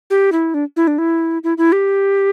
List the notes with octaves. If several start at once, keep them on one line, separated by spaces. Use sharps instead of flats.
G4
E4
D4
E4
D4
E4
E4
E4
G4